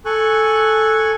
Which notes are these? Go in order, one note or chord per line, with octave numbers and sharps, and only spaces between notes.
A4 G#5 C#6 F#6